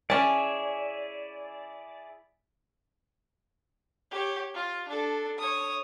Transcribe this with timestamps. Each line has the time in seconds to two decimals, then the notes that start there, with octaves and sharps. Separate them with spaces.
0.10 C#4 E4 G#4 D5 A5
4.11 G4 C#5
4.54 F4
4.88 D4 A4
5.39 C#5 D#6